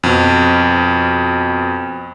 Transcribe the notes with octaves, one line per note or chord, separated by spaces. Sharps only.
F2 B2